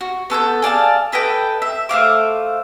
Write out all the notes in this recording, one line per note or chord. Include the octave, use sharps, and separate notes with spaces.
F#4
B3 A4 C#6 G6
G#4 D5 F5 A5
A4 B4 D#5 G5
E5
A3 C5 F5 D6